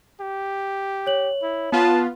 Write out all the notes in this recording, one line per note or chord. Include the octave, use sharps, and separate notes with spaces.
G4
C#5 F#7
E4
B3 F4 B4 A5